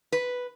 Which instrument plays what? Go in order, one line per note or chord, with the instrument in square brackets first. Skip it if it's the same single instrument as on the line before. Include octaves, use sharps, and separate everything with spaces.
[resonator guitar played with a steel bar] B4